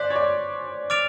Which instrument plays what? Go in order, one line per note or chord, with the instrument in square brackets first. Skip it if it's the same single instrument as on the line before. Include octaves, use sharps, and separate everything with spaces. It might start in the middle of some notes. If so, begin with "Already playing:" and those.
Already playing: [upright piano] C5 D5 [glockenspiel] F#6 B6
[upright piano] C#5
D5
[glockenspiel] D6 F6 A6 D7 F7